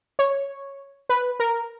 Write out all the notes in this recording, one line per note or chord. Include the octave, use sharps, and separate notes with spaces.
C#5
B4
A#4